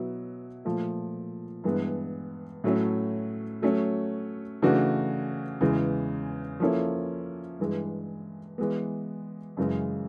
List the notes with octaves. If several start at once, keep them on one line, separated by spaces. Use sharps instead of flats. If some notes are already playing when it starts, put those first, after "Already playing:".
Already playing: B2 F#3 B3 E4
A#2 F3 A3
G2 E3 G#3 B3
A2 F#3 A3 C#4
F#3 A3 C#4
C#3 E3 A3 D4 F#4
E2 C#3 E3 G#3
F3 A#3 C#4 E4 A4
G2 E3 G#3
E3 G#3 B3
F#2 C#3 E3 G#3